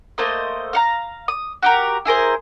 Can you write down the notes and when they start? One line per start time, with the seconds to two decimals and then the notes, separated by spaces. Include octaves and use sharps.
0.18 A3 A#3 C5 D#5
0.73 F5 F#5 A#5
1.28 D#6
1.63 F#4 G4 A#4
2.05 E4 G#4 A#4 C5